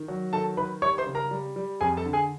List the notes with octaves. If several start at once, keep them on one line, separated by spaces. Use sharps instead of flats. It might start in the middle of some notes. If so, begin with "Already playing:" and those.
Already playing: D#3
F#3
D#3 A4 A5
D#3 B4 B5
G3 C#5 C#6
C5 C6
C#3
A#4 A#5
G3
G3
F2 G#4 G#5
A4 A5
D3
G#4 G#5